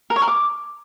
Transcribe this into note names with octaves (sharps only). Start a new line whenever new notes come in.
A#4
C#5
A#4
D6